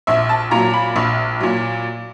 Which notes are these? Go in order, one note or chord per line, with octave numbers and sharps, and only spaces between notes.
A#1 E5
A5
A#2 F#3 A#5
B5
A#1
A#2 F#3